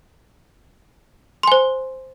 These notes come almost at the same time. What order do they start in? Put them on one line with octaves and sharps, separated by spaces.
C6 G#5 C5